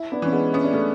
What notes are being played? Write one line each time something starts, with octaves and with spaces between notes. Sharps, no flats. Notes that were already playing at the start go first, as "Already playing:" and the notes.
Already playing: E4
B3 D4
E3 C#4
G#3 B3
B3 C#4
D4
A3 C#4